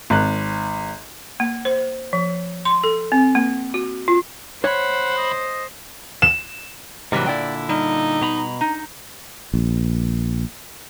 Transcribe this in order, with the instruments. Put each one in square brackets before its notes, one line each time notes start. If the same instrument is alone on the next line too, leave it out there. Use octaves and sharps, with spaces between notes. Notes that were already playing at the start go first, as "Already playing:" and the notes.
[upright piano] G#1 F#6
[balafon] A#3
C5
F3
C6
A4
C4
A#3
F#4
F4
[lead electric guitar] D2 B5 [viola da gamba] C5 [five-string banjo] C#5 [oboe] F#5
[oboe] D#5
[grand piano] E7
[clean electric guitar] G#2 G3 A#3 [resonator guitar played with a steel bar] C3 E3 F#3
[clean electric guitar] A#2 D3 E4 [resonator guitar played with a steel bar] D5 G5
[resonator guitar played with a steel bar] G3 [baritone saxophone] D#4
[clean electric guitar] B2 A#5 B5
[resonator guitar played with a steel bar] D#4
[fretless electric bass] A#1